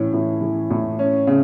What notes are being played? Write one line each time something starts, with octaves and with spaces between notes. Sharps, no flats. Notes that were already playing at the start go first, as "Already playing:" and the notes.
Already playing: A2 E3 C#4
A2
E3
A2
C#4
C#3